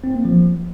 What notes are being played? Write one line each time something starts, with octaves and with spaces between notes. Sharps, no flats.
C4
A#3
F3